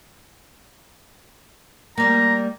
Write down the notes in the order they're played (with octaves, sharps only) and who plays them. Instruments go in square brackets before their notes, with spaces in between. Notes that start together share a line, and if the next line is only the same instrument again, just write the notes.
[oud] G3 A#3 [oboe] A#5